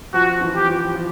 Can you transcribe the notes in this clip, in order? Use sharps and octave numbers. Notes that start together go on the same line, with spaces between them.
F3 F#4
E3
G4
F3
F3